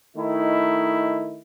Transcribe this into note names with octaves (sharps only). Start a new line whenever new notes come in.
D#3 A3 D#4 E4